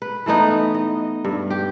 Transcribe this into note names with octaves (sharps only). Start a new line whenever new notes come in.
B4
E3 A3 B3 D#4
D#5
G2
G4